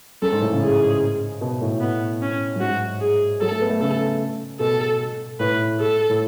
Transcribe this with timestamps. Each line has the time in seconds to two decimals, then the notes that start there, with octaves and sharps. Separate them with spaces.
0.22 F#2 A4
0.32 G#2
0.41 A2
0.52 C#3
0.62 G#4
1.41 B2
1.61 A2
1.81 B3
2.21 C#4
2.56 F#2
2.60 G#2 F#4
3.01 G#4
3.41 F#3 A4
3.51 A3
3.61 B3
3.70 A3
3.81 C#3 A4
4.60 B2 A4
5.39 A2 B4
5.80 A4
6.09 A2